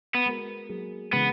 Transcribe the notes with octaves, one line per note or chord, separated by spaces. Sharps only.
B3
G#3 B3 F#4 A#4
F#3 A#3 D#4 G#4
C#3 E3 G#3 B3